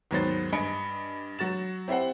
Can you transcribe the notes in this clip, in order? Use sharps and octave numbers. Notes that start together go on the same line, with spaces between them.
D#2 G#2 F#3 B3 C5 A6
G2 D#5 G#5 B5 C#7 D7
F#3 F#4 A6 E7
C4 E4 G4 C5 F#5